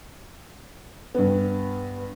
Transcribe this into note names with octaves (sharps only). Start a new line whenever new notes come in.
G2 B3